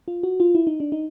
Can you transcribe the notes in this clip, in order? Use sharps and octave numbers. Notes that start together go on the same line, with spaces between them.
F4
F#4
F4
E4
D#4
D4
D#4